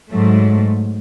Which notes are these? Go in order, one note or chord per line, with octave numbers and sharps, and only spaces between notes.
G#2 F#3 A3